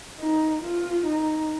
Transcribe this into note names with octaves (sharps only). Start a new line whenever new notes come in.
D#4
F4
D#4